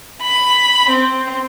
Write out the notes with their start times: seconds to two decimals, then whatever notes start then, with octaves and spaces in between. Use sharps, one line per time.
0.22 B5
0.89 C4